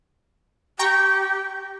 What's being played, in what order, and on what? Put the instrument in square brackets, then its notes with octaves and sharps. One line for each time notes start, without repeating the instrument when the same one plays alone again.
[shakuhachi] G4 [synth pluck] G5 A#5 C#6